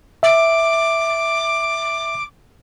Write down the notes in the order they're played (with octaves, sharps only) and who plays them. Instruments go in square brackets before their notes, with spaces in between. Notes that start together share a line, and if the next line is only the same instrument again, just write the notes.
[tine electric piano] E5 [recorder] D6